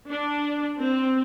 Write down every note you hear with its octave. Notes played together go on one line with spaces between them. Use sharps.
D4
C4